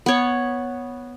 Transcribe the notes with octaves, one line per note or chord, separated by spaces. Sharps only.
B3 C#5